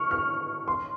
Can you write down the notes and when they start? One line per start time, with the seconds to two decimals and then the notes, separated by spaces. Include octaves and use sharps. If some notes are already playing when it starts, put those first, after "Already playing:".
Already playing: C#6 F6
0.11 F6
0.68 C6